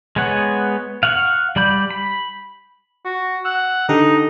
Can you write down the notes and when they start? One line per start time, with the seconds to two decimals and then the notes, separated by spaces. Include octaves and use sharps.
0.16 G#3 B3 C#5 F#5
1.03 F5 F#5 C#6
1.56 G3 D5 B5 G6
1.91 B5
3.05 F#4
3.45 F#5 E6
3.89 D3 D#4 G4 A4